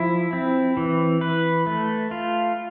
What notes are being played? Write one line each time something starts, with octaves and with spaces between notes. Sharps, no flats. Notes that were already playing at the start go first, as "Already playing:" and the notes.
Already playing: F3 E4
C4
E3
B4
A3
F4